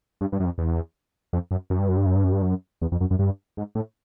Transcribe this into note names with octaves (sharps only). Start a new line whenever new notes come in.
G2
G2
F#2
F2
E2
F2
F#2
F#2
G2
F#2
G2
F#2
G2
F#2
G2
F#2
E2
F2
F#2
F#2
G2
G#2
A2